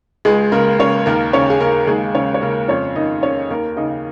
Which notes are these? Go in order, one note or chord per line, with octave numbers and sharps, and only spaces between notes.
C#2 G#3 G#4
C#3 A#3 A#4
C#3 C#4 C#5
D#2 A#3 A#4
C#3 C#4 C#5
G#4
C#3 A#3 A#4
D#2 G#3 G#4
C#3 C#4 C#5
C#5
C#3 A#3 A#4
F2 C#4 C#5
D#3 D#4 D#5
D#3 C#4 C#5
D#2 A#3 A#4
C#3 D#4 D#5